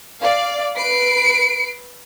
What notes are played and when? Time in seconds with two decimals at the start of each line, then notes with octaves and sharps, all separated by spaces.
0.19 D5 F5
0.76 B4 C7 D7